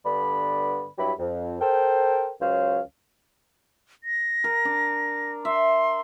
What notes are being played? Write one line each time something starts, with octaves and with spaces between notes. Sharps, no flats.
G2 D3 B3 D5 B5
G2 F#3 E4 G4 B5
F2
A4 A#4 C5 G5
C#2 F#3 C#4 C5 F5
A#6
A#4
D4
E5 C6